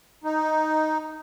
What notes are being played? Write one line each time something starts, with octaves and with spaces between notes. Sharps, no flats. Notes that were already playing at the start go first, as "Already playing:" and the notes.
D#4